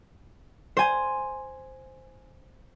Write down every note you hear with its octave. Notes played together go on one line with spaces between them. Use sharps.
C5 G#5